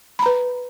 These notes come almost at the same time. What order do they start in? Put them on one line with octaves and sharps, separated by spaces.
B5 A#5 B4